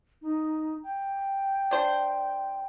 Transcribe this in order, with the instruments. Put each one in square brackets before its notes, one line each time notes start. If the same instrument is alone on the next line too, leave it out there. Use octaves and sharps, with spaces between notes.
[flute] D#4
G5
[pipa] D4 C5